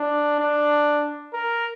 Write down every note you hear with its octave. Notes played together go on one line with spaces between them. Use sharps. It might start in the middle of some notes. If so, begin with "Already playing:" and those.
Already playing: D4
D4
A#4